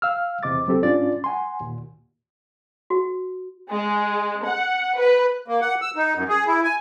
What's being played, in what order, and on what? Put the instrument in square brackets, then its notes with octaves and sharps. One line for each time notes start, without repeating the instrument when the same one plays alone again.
[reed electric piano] F5 E6 F6
E2 C3 D#5 D6 A6
C#2 F#3 C4 G4 A4
G#2 C#4 D4 F4 D5 A6
F#5 G#5 C6
D#2 A#2
[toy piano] F#4
[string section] G#3
F#5
B4
[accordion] A#3
F#5
E6
D#4
F#2
G#4
E4
G#5